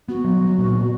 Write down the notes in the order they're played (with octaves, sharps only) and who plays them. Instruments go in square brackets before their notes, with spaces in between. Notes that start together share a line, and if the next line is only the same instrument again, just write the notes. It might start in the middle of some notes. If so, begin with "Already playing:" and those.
[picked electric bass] B3 [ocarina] F#4
[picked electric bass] F#3
F#3
A#2
B3